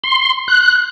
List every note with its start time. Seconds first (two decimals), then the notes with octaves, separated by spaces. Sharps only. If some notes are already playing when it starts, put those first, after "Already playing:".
0.04 C6
0.48 F#6